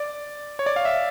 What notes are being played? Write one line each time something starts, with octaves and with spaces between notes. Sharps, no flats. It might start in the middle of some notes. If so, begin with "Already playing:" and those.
Already playing: D5
C#5
D5
F5
E5